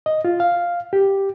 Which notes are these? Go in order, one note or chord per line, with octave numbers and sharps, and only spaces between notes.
D#5
F4
F5
G4